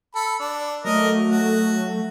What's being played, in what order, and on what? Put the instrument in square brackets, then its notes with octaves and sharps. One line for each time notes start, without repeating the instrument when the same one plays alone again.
[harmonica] A4 B5
D4
[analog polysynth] F#3 A3 [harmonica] A#4 D#5
[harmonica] F#4